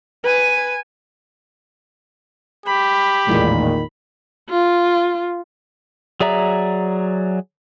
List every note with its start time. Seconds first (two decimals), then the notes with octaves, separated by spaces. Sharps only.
0.24 B4 G#5
2.66 G4 B5
3.27 A1 E2 A#2 D#3 G#3
4.50 F4
6.20 F#3 G#4 D5 E5 A#5